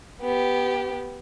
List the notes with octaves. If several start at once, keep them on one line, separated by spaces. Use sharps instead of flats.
B3 G4